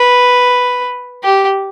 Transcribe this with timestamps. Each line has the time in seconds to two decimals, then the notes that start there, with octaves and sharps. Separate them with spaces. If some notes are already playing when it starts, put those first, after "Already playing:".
Already playing: B4
1.23 G4